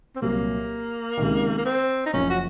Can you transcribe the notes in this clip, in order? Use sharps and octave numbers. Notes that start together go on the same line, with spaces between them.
C4
C2 A#2 F#3 A#3
C#2 C3 D#3
A#3
C4
D#4
F#1 F#2 F3 C#4
F#4